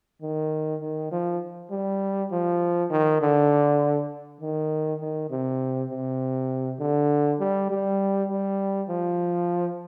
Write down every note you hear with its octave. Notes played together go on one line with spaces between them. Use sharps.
D#3
D#3
F3
G3
F3
D#3
D3
D#3
D#3
C3
C3
D3
G3
G3
G3
F3